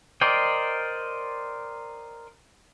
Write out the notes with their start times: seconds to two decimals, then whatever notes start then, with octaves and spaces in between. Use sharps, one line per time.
0.21 A#4 C5 D5 D#5 G5